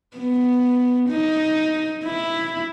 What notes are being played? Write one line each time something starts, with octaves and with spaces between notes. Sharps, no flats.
B3
D#4
E4